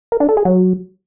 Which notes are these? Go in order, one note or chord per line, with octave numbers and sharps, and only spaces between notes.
A#4
D4
A4
G#4
F#3